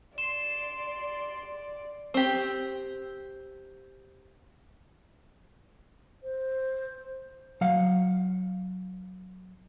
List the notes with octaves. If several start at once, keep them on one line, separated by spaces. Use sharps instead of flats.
D5 C6 E7
C4 G4
C5
F#3 F5 F#5